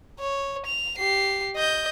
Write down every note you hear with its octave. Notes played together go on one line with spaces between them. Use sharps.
C#5
F7
G4 C7
D#5 G6